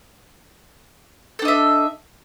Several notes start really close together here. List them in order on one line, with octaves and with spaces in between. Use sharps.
A4 D4 D#5 E5